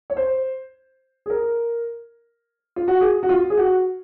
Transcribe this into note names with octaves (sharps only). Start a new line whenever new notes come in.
C#5
C5
G#4
A#4
F4
F#4
G#4
F#4
F4
G#4
F#4